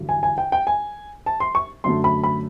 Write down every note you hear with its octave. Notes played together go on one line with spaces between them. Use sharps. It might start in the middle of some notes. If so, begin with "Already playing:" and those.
Already playing: A1 G2 D3 F#3
G#5
G#5
G5
G5
G#5
A5
C6
C#6
F#2 D3 F#3 A3 C6
B5
B5